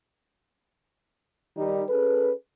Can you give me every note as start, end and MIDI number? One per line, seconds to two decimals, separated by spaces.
1.57 1.82 51
1.57 1.82 55
1.57 1.82 63
1.89 2.32 61
1.89 2.32 68
1.89 2.32 69
1.89 2.32 71